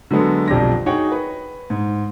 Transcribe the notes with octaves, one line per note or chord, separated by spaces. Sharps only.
D3 F#3 G#3 B3 A4
B1 F2 G4 D5 A#6
D#4 F#4 G#4 C#5 F#5 G5
B4
G#2